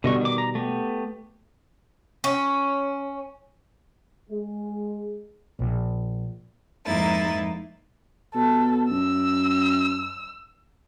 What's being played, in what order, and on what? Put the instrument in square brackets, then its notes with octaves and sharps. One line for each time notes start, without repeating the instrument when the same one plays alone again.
[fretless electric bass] B2 G3 [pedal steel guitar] D3 D#5 C#6
[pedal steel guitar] D#3 D6
A#5
A3 B3 G4
[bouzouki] C#4
[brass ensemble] G#3
[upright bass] A#1
[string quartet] F2 G#2 A#3 D#4 E4 A6
[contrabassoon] B2 [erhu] A4
[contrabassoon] F#2 [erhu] E6